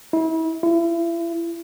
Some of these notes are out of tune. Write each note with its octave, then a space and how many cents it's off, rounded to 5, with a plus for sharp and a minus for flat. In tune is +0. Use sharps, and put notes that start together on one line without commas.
E4 -35
E4 +35